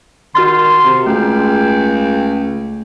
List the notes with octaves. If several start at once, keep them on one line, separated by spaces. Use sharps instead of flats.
D#3 F#4 C6 F6 A6
C3
C#2 A3 G5